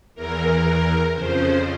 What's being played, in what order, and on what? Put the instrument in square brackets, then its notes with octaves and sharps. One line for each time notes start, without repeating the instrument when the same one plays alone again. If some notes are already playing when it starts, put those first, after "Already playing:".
[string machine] E2 E3 A#4
F2 C#3 F3 C5